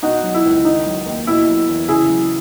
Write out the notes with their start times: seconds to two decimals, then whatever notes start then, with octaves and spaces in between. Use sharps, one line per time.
0.03 B2 D#4 F#4
0.23 F#3
0.34 E4
0.45 C#2
0.65 D#3 D#4
0.86 F#3
1.06 D#2
1.27 B2 E4
1.48 F#3
1.69 E2
1.88 C#3 E4 G#4
2.09 F#3